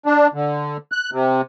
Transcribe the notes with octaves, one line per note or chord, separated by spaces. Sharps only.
D4
D3
F#6
C3